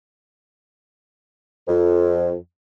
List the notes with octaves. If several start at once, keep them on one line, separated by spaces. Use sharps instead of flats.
F2